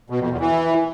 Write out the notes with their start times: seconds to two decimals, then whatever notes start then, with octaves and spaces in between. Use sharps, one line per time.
0.10 B2
0.20 F2
0.30 E2
0.41 E3